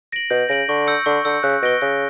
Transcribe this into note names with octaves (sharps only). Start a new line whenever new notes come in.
A#6 D7 F#7
B2 G6
C#3 A#6 D7 F#7
D3 C#6
E6 G6 C#7
D3 C#6
D3 E6 G6 C#7
C#3 F#6
B2 A#6 D7 G7
C#3 F#6